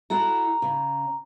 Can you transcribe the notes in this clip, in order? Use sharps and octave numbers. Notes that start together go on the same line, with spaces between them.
E4 F#4 A4 A#5
C#3